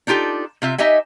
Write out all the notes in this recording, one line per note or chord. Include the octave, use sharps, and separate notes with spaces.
D4 D#4 F4 G4 A4
C3 F4 E5
D#4 G4 D#5 E5 G#5